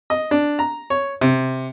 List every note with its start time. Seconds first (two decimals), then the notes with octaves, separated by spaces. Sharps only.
0.10 D#5
0.31 D4
0.59 A#5
0.90 C#5
1.21 C3